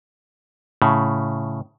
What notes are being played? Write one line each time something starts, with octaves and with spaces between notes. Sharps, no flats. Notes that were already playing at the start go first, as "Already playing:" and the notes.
A2 C#3